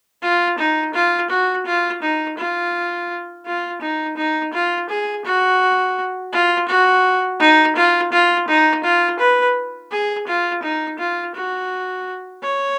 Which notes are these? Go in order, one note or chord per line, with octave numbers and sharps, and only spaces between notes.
F4
D#4
F4
F#4
F4
D#4
F4
F4
D#4
D#4
F4
G#4
F#4
F4
F#4
D#4
F4
F4
D#4
F4
B4
G#4
F4
D#4
F4
F#4
C#5